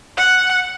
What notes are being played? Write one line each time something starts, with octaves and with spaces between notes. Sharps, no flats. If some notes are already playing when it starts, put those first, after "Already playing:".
F#5